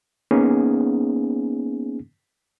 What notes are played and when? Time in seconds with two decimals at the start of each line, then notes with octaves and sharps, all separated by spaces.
0.31 A#3 B3 C#4 D#4 G#4